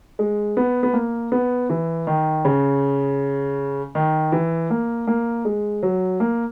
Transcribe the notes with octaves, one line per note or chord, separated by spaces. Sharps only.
G#3
B3
B3
A#3
B3
E3
D#3
C#3
D#3
E3
A#3
A#3
G#3
F#3
A#3